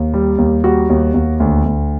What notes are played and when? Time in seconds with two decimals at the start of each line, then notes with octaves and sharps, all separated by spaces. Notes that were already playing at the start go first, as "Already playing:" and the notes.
Already playing: D#2
0.14 G3
0.38 D#2
0.64 G3 F#4
0.90 D#2
1.14 D#2
1.40 D2
1.66 D2